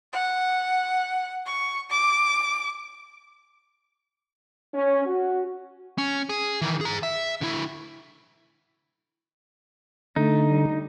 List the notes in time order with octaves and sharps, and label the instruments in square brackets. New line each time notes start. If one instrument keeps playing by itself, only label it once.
[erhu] F#5
C#6
D6
[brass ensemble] C#4
F#4
[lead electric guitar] C#4
G#4
D#3 E3
G#4 A#5
E5
D3 E4
[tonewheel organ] D3 [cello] A3 [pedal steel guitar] D#4
[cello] G3